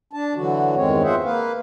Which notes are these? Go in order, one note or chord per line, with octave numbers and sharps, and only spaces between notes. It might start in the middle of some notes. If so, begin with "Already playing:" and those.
D4 A5
D3 E3 F#3 F#4
E2 G2 D#3 G#3 C4 C#5
F4 G#4 C5 E5 F#5
A#3 B4 F5